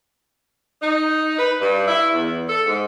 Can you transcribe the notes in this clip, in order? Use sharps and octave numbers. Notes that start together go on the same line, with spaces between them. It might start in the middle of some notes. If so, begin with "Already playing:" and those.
D#4
B4
G2
E4
E2
A4
G#2